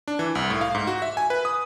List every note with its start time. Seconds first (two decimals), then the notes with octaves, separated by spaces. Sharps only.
0.08 D4
0.19 E3
0.35 C2
0.50 A2
0.61 F5
0.75 G#2
0.87 F#4
1.02 E5
1.17 G#5
1.30 B4
1.45 D#6